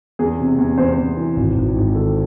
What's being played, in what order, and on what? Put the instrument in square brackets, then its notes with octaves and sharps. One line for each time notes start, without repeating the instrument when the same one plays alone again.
[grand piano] E2 G#4
C3
E2
E2 C5
E2
E3
G#1
G#1
G#2
D#3 A4